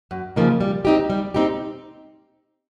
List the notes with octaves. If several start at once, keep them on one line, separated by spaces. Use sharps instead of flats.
F#2
C#3 F3 A#3 D#4
G3
C4 D#4 G4
G3
C4 D#4 G4